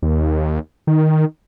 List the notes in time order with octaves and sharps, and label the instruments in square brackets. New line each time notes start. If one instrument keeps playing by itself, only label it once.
[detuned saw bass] D#2
D#3